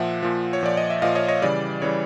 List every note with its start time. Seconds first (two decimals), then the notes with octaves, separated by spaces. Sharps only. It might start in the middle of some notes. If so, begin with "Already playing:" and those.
Already playing: A#2 F3 E5 F#5
0.22 A#2 F3
0.53 C#5
0.63 A#2 F3 D5
0.77 D#5
0.90 E5
1.02 A#2 F3 D#5 F5
1.15 C#5 D#5
1.28 C#5 D#5
1.42 C#3 E3 G3 D5
1.82 C#3 E3 G3 C#5